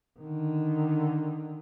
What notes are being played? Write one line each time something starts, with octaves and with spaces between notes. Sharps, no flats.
D3 D#3